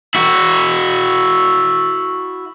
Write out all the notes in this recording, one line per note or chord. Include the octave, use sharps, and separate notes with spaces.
E4 F#4